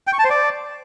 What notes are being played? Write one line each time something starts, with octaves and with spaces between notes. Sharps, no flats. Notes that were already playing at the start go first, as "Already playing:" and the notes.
G5
C#6
A5
C5
D5